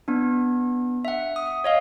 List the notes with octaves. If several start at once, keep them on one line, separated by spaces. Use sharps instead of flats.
B3 D4
E5 F#5
D#6
C#5 D#5 F5